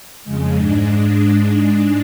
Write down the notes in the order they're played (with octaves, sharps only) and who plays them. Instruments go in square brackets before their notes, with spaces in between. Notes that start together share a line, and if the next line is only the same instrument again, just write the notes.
[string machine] F2 C#3 G#3
G#2 G#3 D4